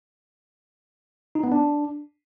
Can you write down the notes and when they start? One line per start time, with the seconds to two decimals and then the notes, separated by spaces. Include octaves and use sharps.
1.35 D#4
1.44 B3
1.52 D4